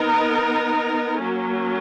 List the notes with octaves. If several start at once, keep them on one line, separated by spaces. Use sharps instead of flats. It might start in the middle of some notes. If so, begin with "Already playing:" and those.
Already playing: B3 D#4 A#4
F#3 A#3 C#4